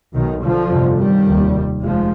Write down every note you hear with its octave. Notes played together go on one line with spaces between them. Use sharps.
B1 B2 D#3
D3 F3
G1 F2 C3
D#3 G3
F1 D#2
F1 F3 G#3